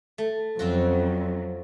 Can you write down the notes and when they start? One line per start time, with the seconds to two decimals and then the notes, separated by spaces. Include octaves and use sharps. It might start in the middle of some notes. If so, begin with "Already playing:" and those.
0.18 A3
0.59 F2 F#3 C4 C#4 F4 F#4